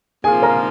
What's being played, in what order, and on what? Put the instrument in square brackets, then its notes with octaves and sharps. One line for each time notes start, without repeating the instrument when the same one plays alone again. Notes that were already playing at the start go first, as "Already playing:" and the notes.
[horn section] C3 F3 A#3 F4 [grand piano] G#4 G#5
[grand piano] A#4 A#5